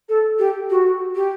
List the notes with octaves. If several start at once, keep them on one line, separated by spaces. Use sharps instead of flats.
A4
G4
F#4
G4